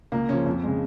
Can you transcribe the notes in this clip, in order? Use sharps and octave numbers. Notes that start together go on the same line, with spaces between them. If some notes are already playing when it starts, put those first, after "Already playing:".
C#2 A#3
C#3 F3 C#4
F2
C#3 G#3